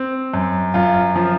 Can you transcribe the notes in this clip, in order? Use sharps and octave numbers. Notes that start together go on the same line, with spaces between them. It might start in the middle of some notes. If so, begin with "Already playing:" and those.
Already playing: C4
F#2
F#2 F4
F3